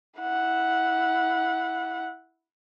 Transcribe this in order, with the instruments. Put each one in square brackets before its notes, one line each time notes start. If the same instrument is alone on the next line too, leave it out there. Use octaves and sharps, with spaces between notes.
[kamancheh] E4 F#5